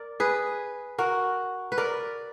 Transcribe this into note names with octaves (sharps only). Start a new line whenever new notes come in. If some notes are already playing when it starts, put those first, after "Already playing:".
Already playing: A#4 D5
G#4 B4
F#4 A#4
B4
A#4 D5